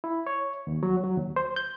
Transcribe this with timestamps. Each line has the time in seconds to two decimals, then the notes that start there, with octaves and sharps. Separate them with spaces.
0.04 E4
0.27 C#5
0.67 D#2
0.83 F#3
1.04 F#3
1.18 D#2
1.36 C5
1.56 G6